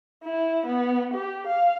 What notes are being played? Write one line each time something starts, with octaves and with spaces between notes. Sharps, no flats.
E4
B3
G4
F5